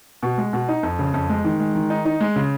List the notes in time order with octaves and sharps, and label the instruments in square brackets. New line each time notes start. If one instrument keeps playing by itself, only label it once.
[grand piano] B2
G#3
B2
D#4
F2
C#3
F2
G#3
D#3
G#3
D#3
D#4
D#4
G#3
C#3